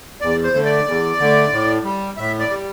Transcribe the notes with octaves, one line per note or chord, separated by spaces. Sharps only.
E2 D5
C5
D3 A3
D5
E2
D3 A3
A2
G3
A2 E5
D5
G3